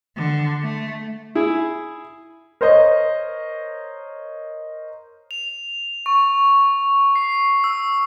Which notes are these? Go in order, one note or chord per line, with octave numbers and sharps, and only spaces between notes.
D3
A3
E4 G#4
A#4 C5 C#5 D#5
F7
C#6
C7
E6